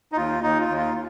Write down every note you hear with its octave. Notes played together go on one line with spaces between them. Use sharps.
D#4
D#2 F4
D#2 D#4
F4
D#2
F4